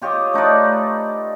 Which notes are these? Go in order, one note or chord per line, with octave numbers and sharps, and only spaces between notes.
F4 G4 C#5 D#5
A3 D#4 B4 D5